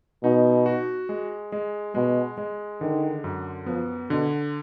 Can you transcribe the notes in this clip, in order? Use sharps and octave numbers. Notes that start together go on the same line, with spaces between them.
B2 D#4
F#4
G#3
G#3
B2 G#3
G#3
D3 D#3
F#2
F3 B3
B2 D3